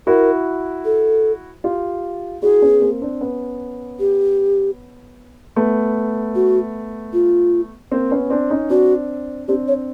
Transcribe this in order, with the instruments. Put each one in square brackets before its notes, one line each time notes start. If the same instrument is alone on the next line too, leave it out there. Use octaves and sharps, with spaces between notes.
[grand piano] E4 F#4 [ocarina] A#4
[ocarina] A4
[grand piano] F4 G4
[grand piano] E4 F#4 [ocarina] G#4
[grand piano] B3 C#4
A#3 C4
C4 D4
B3 C#4
[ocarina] G4
[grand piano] A3 B3
[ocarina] F#4
F4
[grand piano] A#3 C4
B3 C#4
C4 D4
C#4 D#4
[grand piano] C4 D4 [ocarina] F#4
[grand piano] C4 D4 [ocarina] G4
[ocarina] C#5